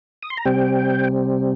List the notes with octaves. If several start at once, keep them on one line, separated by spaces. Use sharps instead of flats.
D#6
C6
A#5
C3 G3 C4 G5